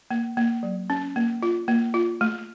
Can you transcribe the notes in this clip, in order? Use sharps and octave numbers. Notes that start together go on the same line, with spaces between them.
A#3
A#3
F#3
C#4
A#3
F4
A#3
F4
A3